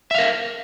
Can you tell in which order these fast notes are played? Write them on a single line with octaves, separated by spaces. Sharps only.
E5 F5 A#4